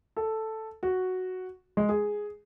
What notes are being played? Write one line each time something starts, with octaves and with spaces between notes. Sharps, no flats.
A4
F#4
G#3
G#4